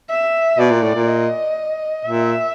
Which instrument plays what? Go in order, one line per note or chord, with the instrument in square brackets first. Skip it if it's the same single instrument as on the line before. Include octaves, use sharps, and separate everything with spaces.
[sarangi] E5
[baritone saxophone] B2 [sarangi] D5
[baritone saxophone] A#2
A2
A#2
[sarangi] D#5
[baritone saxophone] A#2 [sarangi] E5